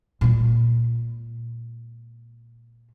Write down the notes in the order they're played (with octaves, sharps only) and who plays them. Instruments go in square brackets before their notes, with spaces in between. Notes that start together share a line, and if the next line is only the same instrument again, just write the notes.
[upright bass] A#2 G#3